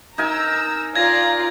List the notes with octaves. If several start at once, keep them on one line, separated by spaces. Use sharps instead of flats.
D#4 A#4 G#5 A#5 E6
F4 D5 A#5 G#6 A#6